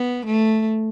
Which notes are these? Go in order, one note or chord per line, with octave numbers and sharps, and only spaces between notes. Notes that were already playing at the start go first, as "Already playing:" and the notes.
Already playing: B3
A3